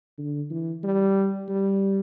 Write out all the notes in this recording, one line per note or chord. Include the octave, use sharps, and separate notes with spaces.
D3
E3
G3
G3